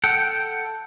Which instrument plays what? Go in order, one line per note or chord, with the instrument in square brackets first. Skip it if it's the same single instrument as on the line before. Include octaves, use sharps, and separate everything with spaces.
[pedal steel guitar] A4 F#5 G5